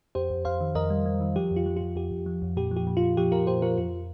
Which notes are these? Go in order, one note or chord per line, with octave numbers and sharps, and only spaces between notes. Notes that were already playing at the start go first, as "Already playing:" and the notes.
F2 G4 C5
F2
F2 C5 F5
D#3
F2 A#4 D#5
G3
G3
D#3
F3 G4
F2
F4
F3
F2 F4
F2 G4
F2
F3
F2
A#2 G4
F3
G4
A#2
F4
A#2
F3 G4
A#2 F4 A#4
A#2 G4 C5
F3 F4 A#4
F2 F4